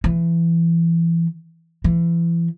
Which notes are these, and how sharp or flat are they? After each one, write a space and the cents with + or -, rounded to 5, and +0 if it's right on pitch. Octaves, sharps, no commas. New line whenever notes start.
E3 +25
E3 +35